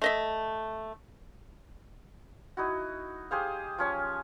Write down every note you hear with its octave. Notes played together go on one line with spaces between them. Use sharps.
A3 D#5 E5
D#4 E4 F#4
G4 G#4 C5 F5
F3 C#4 C#5